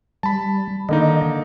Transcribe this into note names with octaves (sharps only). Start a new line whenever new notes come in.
G3 A5 B5
D3 D#3 A#3 D#4 D#5